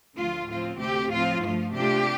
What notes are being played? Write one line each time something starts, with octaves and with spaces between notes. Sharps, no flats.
D2 D3 F3 A3 F4
A2 F3 C4 F4
D2 C3 A3 C4 G4
A2 F3 C4 F4
G2 F3 A3 F4
C3 A3 D4 F4 G4